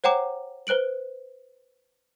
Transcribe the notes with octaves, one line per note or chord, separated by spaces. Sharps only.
C5 C#5 F#5 G5 A#5 D6
B4 C5 F#6 D7 F#7